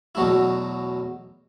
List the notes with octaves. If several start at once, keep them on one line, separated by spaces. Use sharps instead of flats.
E2 B2 F#3 A3 E4